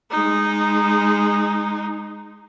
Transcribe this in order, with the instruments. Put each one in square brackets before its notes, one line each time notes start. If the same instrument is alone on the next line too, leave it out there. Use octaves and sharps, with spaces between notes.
[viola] G#3 D#4